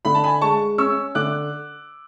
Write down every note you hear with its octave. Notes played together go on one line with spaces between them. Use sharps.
D3 B5
A5
G#5 B5
G#3 A5 C#6
C#4 C#6 E6
D3 D6 F#6